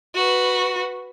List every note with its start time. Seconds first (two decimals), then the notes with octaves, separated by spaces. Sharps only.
0.15 F#4 B4